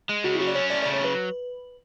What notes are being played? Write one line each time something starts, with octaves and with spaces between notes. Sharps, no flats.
G#3
C#3 F#4
E4
F#3 F#4
D5
C#4 C#5
A3 D5
D5
C#3
C#5
F#3 B4